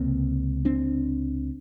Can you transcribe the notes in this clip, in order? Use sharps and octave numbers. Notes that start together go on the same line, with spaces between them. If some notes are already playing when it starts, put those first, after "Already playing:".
Already playing: C#2 C3 A#3 C4
C4 D4